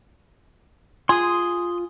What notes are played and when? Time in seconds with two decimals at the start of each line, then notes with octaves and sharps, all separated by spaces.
1.09 F4 G#4 C6 D#6